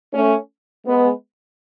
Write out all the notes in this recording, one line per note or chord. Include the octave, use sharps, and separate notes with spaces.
A3 C#4
G#3 B3